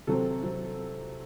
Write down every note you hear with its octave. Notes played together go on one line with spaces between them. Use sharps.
C3 F#3 C4 A4
C3 F#3 C4